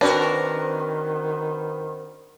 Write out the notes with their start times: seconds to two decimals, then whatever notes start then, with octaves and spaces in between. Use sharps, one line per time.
0.01 D#3 C4 D4 F#4 A#4 B4